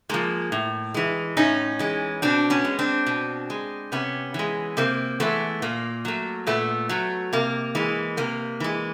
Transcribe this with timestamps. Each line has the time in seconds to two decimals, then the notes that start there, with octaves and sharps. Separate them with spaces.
0.09 F3 G#3 A#3
0.52 A2
0.94 E3 G#3
1.37 A2 C#4 D#4
1.79 E3 G#3
2.22 B2 C4 D4
2.50 B3 C#4
2.64 G#3
2.79 C4 D4
3.06 B2
3.50 G#3
3.92 C3 B3 C#4
4.34 E3 G#3
4.77 C3 A#3 C4
5.20 E3 G#3 A3 B3
5.62 A#2 A#3
6.05 F#3 A3
6.47 A#2 A3 B3
6.89 F#3 A3
7.33 C3 A#3
7.75 E3 G#3
8.17 C3 A#3
8.60 E3 G#3